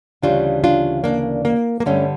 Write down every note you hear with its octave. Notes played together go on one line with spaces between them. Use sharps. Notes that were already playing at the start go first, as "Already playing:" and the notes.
D2 C#3 E3 G3 D4 F4
D4 F4
A#3 D4
A#3
A#3
G2 D3 G3 A3 C#4